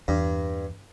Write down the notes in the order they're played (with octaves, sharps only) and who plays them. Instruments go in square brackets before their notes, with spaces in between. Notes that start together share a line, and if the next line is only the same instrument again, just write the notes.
[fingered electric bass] E2 [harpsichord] G2